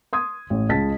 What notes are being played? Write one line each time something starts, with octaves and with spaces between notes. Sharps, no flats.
C6 D#6 G#6
A1
C#2 G#3 D#5 A5 A6 B6